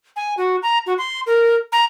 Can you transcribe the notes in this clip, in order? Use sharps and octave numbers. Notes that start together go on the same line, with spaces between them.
G#5
F#4
A#5
F#4
C6
A#4
A#5